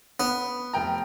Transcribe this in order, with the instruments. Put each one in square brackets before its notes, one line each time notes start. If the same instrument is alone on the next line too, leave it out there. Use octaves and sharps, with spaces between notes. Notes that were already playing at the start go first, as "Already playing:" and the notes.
[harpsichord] B3
[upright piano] F1 G5 A#5